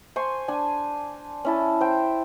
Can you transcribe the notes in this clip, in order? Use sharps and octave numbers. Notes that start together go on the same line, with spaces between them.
C5 G#5 C6 C#6
D4 G#5
C#4 E4 A5
C5 G5